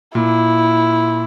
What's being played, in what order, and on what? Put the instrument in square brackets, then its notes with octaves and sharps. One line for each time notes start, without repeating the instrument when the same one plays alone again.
[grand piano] A#2 [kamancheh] E4